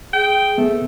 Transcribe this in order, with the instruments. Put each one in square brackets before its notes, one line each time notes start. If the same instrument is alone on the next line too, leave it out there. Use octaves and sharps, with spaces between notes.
[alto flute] G#4 [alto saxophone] G5
[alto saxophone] A3 [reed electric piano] B3